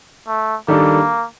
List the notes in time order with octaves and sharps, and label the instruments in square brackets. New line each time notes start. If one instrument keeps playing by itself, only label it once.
[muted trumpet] A3
[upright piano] D#3 G3 D4 A4 [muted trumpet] A#3